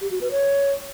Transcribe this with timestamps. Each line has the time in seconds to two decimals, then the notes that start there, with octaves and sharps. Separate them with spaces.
0.01 G4
0.11 F#4
0.21 B4
0.32 C#5